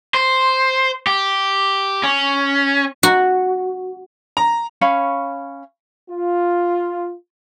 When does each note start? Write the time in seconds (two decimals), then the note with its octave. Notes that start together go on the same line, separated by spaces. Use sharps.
0.14 C5
1.07 G4
2.03 C#4
3.03 F#4
4.37 A#5
4.81 C#4 C#5 F5 B5
6.10 F4